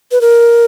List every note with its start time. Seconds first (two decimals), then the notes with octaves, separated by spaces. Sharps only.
0.11 B4
0.21 A#4